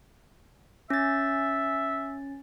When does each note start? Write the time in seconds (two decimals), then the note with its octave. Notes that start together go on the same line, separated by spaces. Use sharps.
0.90 C#4 E5 A6